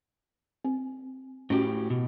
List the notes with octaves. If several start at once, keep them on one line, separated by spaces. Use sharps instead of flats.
C4
A2 C#4 F#4 G4
B2